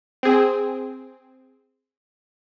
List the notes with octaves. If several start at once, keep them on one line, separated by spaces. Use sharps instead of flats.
C4 G#4